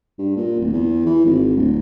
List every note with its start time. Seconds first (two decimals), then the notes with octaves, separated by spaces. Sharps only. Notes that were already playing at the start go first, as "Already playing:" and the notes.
0.19 G2
0.36 A#2
0.59 D1
0.73 E2
1.06 E3
1.26 G#1
1.57 D1